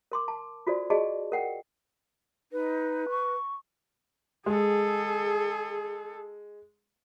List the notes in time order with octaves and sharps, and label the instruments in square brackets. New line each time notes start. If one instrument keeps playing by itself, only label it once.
[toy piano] A#4 C6 D6
A5
F4 F#4 A4 C5 D5
F#4 G#4 D5 D#5 A5 C#6
A#4 F#5 G5
[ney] D#4 [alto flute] B4
[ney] C#6
[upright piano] G#3 [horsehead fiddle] G#4 A4